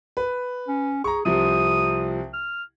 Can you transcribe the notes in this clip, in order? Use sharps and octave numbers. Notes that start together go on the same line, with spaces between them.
B4
C#4
G#4 A#5 C#6
C2 C3 F3 D#6
F6